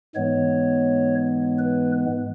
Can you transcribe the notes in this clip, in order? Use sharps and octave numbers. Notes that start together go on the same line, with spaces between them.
G#2 E3 G#3 B3 C#5
B4